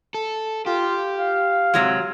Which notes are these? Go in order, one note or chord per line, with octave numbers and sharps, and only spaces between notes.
A4
F4 G4
F5
C3 F#3 G#3